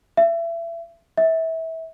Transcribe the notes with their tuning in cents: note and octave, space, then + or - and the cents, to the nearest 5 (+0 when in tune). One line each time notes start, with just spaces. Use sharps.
E5 +30
E5 -25